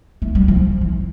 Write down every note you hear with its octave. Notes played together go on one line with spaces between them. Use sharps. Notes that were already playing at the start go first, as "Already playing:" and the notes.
A3
G3
F3
E3